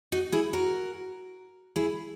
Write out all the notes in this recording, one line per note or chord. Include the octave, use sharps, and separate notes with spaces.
D#4 F#4
E4 G#4
F#4 A#4
E4 G#4